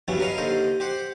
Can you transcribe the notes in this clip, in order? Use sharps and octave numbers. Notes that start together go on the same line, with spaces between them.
G2 E3 F#3 G3 B3 C#4
A#4 B4 C#5 D#5 F5
D#2 D3 C5 D#5
G4 C5 F#5